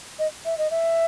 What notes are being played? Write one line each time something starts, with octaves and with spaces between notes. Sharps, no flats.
D#5
E5
D#5
E5